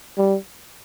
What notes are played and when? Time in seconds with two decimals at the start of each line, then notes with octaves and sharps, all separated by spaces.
0.18 G3